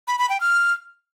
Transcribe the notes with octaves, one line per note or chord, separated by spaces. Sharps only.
B5
B5
G5
F6